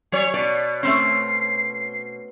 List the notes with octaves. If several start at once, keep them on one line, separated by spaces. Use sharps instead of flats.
F#3 C#5
B2 D5
A3 C4 C#4 C7